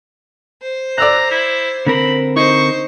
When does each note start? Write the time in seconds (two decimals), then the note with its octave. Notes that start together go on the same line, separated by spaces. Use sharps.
0.62 C5
0.98 D5 A#5 E6 F#6
1.31 E4
1.87 D3 C4 A#4 B5
2.36 D#4 C5 C#6